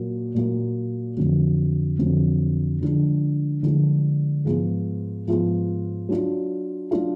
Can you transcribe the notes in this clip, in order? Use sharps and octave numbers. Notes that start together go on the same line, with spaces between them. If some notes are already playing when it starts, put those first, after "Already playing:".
Already playing: A#2 F#3 A#3
A#2 F#3 A#3
F2 D3 F#3
F2 D3 F#3
D3 F3 G#3 D4
D3 F3 G#3 D4
G#2 F3 B3 F4 G#4
G#2 F3 B3 F4 G#4
F#3 D4 F4
F#3 D4 F4